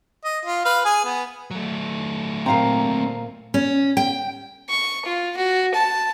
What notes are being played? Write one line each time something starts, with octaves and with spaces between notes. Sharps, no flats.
D#5
F4
B4 F5
G#4 G#5
B3
F#3 A3
A#2 C4 F5 A#5
C#4
G5
C#6
F4
F#4
A5